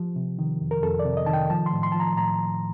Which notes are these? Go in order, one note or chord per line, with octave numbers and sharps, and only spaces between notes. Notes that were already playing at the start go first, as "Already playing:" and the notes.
Already playing: F3 G4
C3
D#3
F2
A#4
F2 A4
D5
C3
D#5
D#3 A5
G5
F3 A5
C6
A2
C6
F3 A5
A#5
A2 A#5